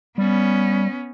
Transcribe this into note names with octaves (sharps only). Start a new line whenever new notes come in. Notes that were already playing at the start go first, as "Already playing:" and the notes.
G3 B3 C#4